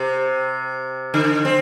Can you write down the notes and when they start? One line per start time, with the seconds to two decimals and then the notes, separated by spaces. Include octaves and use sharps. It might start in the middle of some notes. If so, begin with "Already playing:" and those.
Already playing: C3
1.14 D3
1.45 C4